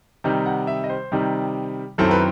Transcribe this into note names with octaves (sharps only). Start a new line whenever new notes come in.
C3 D#3 G3 D#4
F#5
E5
D#5
C5
C3 D#3 G3 D#4
F#2 D#3 F#3 C4 E4 A4
B4